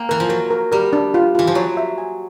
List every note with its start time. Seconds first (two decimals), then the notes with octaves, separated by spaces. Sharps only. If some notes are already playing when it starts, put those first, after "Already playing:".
Already playing: A#3 G5
0.09 E3 A#4
0.20 F3
0.29 F#3 A#4
0.51 A#4
0.72 G3 A#4
0.93 D4
1.14 F4
1.35 E3 F4
1.47 F3
1.55 F#3 C#5
1.77 E5
1.98 G#5